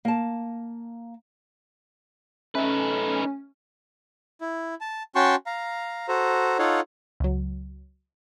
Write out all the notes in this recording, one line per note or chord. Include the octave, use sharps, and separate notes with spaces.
A#3 A5
A3 C#4 D#4 B4
E4
A5
C#4 F#4 G5 A5 C6 C#6
F5 A#5
F#4 A4 C5 A#5
D#4 F4 A4 C#5 F5 F#5
C#2 F#3